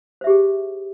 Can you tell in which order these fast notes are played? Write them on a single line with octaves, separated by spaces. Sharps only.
C5 E5 G4 G#4